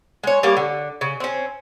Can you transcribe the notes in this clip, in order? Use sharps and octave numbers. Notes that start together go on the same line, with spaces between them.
G#3 C#5
G3 A#3 G#4 C#5
D3
C#3
C4 C#4